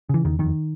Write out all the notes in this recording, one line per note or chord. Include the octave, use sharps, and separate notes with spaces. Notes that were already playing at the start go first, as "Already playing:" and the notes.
C#3 E3
E2 D#3
F2 D#3